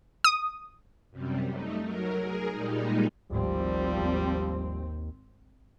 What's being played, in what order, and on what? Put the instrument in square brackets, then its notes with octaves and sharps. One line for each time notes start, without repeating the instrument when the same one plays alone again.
[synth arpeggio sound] D#6
[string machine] F#2 C3 G3
A3 D#4
F#3 A#4
G#4 A#4
A#2 G3 G#3 D#4
[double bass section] G#1 C4 [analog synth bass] D2 [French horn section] F3 G3
[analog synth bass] D#2